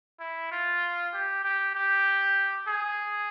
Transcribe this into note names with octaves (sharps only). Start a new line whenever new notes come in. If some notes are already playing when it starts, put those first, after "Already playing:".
E4
F4
G4
G4
G4
G#4